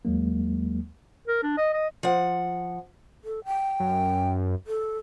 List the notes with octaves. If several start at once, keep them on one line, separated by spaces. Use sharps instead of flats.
D#2 F#3 G#3 A#3
A#4
D4
D#5
D#5
F3 F#5
A4
G5
F#2
A4